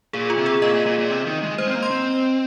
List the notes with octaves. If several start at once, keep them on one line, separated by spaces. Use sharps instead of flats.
A#2 G#4
F4
C3
G#4
A#2 D#5
A#2
A#2
A#2
C3
D#3
G#3
G#3 C5
C4
A#3
C6
C4